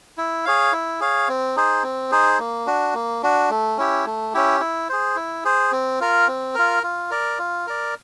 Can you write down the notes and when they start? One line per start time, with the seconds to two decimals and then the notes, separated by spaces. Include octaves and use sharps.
0.18 E4
0.46 G#4 C#5 F5
0.72 E4
1.00 G#4 C#5 F5
1.28 C4
1.56 D#4 G#4 C5
1.83 C4
2.11 D#4 G#4 C5
2.39 A#3
2.66 D4 F#4
2.94 A#3
3.23 D4 F#4
3.50 A3
3.77 C#4 E4 G4
4.06 A3
4.34 C#4 E4 G4
4.60 E4
4.89 G#4 C5
5.16 E4
5.45 G#4 C5
5.72 C4
6.00 F4 A#4
6.28 C4
6.55 F4 A#4
6.83 F4
7.11 A#4 D5
7.39 F4
7.67 A#4 D5